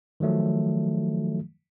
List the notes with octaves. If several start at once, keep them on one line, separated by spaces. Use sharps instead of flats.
D#3 F3 F#3 A3